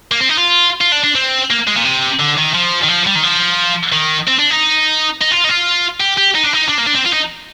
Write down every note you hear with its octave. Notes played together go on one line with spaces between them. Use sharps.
A#3
C4
D#4
F4
F4
D4
D4
C4
A#3
G#3
A#2
C3
D3
D#3
F3
D#3
F3
G3
D#3
F3
D#3
C4
D4
D#4
D#4
F4
D#4
F4
G4
G4
D#4
D4
D#4
D4
A#3
D4
C4
F4
D#4